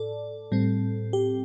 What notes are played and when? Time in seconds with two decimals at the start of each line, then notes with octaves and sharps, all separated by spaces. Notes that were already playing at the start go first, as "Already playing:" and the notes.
Already playing: A2 A4 D5
0.52 A2 G3 C4
1.13 G4